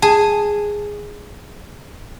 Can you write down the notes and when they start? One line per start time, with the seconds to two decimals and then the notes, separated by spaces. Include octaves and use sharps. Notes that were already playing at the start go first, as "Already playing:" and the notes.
0.02 G#4 A5